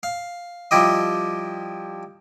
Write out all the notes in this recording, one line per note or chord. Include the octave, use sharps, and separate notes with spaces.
F5
F3 G3 E4 G4 D#5